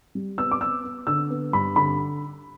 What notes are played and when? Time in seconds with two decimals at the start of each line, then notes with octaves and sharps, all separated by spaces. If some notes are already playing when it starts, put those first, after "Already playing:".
0.15 G3
0.38 B3 E6
0.51 D6
0.61 B3 E6
0.84 B3
1.07 D3 E6
1.30 B3
1.53 G2 B5
1.76 D3 B5